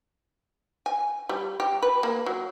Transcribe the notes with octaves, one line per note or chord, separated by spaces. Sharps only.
G#5
G3
G4
B4
A#3
F#3